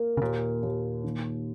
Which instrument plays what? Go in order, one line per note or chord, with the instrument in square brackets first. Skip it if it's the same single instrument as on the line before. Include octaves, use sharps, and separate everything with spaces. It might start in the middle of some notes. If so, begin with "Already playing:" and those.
Already playing: [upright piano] A#3
[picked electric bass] C#3
[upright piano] D#2 [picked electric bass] A#2
[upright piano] D#2
D#3